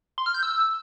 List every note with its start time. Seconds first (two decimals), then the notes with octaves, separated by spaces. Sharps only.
0.18 C6
0.26 F6
0.34 G6
0.43 E6